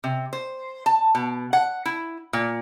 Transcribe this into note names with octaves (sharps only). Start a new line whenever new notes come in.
C3
C5
A5
B2
F#5
E4
A#2